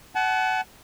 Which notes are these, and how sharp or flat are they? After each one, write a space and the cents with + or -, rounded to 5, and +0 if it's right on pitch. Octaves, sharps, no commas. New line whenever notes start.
F#5 +20 A5 -35